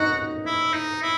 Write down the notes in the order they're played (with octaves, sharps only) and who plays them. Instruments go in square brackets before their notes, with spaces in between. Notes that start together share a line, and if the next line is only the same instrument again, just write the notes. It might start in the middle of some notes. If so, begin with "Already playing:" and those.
Already playing: [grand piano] D#4 [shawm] F#4
[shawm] E4
D#4
E4